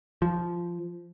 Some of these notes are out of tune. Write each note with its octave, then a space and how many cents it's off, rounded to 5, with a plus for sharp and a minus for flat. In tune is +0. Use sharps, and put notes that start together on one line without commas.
F3 -10